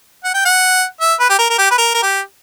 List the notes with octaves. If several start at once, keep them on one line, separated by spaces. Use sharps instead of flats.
F#5
G5
F#5
E5
B4
G4
A#4
A#4
G4
B4
A#4
A#4
G4